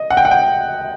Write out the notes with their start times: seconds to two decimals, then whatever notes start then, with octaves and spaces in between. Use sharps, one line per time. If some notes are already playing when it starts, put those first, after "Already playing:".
Already playing: D#5
0.10 F#5
0.17 G5
0.25 F#5
0.31 G5